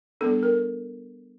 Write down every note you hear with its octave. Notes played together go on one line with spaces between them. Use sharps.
G3 B3 D4 A4
A#4